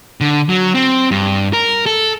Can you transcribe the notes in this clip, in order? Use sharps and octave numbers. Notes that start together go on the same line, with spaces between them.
D3
F#3
C4
G2
A#4
A4